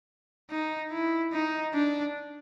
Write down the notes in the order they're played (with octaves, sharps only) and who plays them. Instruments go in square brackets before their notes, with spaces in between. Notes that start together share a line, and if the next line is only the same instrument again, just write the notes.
[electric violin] D#4
E4
D#4
D4